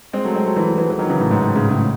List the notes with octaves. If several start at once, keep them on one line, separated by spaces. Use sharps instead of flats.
G#3 C4
F#3 A3
G#3 C4
F#3 A3
E3 G#3
E3 G#3
E3
D#3 F#3
C#3 E3
A2
G#2
A2
A2 C#3
A2 C#3